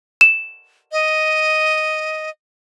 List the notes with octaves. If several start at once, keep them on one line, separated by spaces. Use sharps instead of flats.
E7
D#5